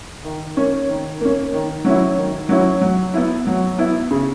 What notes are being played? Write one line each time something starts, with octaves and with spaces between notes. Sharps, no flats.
D#3
A#3 C#4
D#3
A#3 C#4
D#3
F#3 C#4 E4
D#3
F#3 C#4 E4
F#3
B3 E4
F#3
B3 E4
C#3